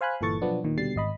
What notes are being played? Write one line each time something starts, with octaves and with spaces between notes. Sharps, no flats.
C5 F5 G#5 B5 F#6
G1 A#2 E3 A4 C#6 A6
B2 F3 F#3 B3 D4
D#2 A#2 D#3
B2 D3 G3 A6 C7
G#1 D#5 B5